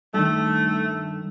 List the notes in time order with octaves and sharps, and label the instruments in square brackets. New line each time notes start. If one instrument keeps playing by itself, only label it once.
[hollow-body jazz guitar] G2 D#3 [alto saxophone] A3